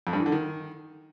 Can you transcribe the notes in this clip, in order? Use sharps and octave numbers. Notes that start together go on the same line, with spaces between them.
F2
G2
E3
D3
D#3